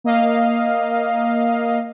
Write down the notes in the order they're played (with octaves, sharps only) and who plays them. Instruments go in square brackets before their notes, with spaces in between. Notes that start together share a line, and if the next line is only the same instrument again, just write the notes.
[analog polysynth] A#3 D#5 F5